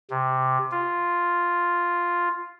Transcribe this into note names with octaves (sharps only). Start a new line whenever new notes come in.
C3
F4